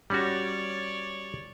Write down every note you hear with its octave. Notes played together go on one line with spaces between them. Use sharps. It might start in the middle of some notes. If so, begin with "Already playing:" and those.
G3 C#4 F#4 C#5 D5